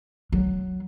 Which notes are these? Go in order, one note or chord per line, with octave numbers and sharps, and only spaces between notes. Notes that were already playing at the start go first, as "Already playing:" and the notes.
F#3